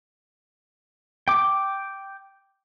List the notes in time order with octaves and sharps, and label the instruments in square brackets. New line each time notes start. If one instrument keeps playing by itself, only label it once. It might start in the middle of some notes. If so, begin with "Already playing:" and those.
[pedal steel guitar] G5 D6